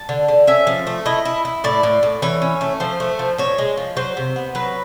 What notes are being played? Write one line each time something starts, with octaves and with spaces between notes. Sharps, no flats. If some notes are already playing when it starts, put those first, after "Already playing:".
Already playing: A5
D3
D3
C#4 E5
F3
A3
E4 D#5
E4
E4
A2 D5
A2
A2
E3 C#5
C#4
A3
F3 C5
A3
F3
A#2 C#5
G#3
F3
F#3 C5
C3
B3
F#3 B4